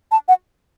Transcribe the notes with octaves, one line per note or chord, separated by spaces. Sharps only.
A5
F#5